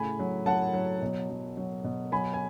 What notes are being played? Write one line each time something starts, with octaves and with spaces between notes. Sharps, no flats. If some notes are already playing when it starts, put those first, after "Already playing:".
Already playing: A2 C#3 G#5 B5
F#3
F#3 F#5 A5
F#3
B2
F#3
F#3
B2
F#3 G#5 B5
G#5